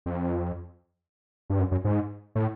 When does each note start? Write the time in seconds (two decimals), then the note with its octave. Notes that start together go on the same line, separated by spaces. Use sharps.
0.06 F2
1.50 G2
1.59 F#2
1.71 F#2
1.84 G#2
2.35 A2